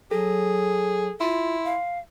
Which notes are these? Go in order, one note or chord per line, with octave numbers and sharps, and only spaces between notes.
F#3 G#4 A4
E4 F4 C6
F5